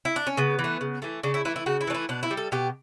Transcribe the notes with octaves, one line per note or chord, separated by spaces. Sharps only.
E4
D4
C#4
C#3 B3
E3
A3
C#3
E3 A3
C#3 D4
E4
E3 A3 E4
E4
C#3 F#4
E4
E3 A3 D4
E4
B2 D4
E4
G3
A4
B2 G4